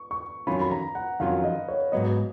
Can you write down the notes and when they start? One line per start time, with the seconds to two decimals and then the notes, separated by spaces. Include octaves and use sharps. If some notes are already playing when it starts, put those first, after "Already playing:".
Already playing: C#6
0.11 C#6
0.47 F2 D#3 F#3 C#4 F4 B5
0.61 B5
0.71 A#5
0.95 F#5
1.20 F2 D#3 F#3 C#4 F4 F5
1.44 D#5
1.68 C#5
1.92 G#2 F#3 B3 D#5